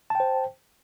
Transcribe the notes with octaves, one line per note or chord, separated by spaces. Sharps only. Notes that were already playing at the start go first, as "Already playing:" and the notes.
C5 G5 A5